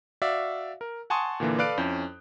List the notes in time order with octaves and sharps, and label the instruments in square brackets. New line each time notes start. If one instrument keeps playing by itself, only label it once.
[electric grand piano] F#4 D5 E5 F5
A#4
F#5 G#5 A5 C6 C#6 D#6
A#2 D3 E3 A#3
A4 B4 D5 F5 F#6 D7
F2 C#4 E4 G6